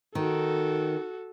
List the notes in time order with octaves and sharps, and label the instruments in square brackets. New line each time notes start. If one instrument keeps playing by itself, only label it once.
[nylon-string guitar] D#3 [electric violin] F#4 A4